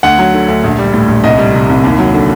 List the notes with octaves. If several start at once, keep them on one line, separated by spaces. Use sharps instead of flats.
D2 F#5
F#3
D3
D2
A#1
G3
A2
A#1
C2 D#5
G3
C3
C2
D#2
F#3
D3